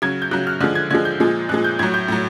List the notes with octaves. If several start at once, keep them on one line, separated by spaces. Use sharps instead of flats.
C#3 F#3 G#6
G6
C#3 F#3 F#6
F6
D3 F3 G#3 F#6
G#6
D3 F3 G#3 G#6
G6
A#2 F3 G#3
A#2 F3 G#3 F#6
G6
A2 F#3 G#6
G6
A2 F#3